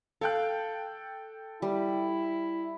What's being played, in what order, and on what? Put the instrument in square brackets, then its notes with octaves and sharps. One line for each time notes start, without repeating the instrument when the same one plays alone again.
[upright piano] A4 G5 F#6 [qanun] F5
[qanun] G3 [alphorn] E4